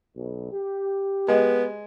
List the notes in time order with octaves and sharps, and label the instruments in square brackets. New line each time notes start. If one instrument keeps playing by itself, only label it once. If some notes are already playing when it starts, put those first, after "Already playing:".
[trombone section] B1
G4
[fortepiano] G#3 [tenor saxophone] B3